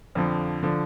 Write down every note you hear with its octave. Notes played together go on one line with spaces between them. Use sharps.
F2 D3 F3
D3 F3